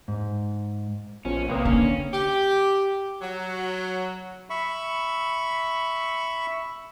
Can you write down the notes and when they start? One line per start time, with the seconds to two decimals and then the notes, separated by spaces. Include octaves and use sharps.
0.08 G#2
1.25 A#1 F3 B3 C#4
1.49 C3 A#3 B4 G5 D#6
1.65 D3 C#4 D4
2.13 G4
3.22 F#3
4.50 E5 B5 C#6